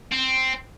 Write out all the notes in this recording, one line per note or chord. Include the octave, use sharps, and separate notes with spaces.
C4